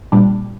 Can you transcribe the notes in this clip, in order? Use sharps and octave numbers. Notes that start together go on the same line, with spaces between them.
A#2 G3 D4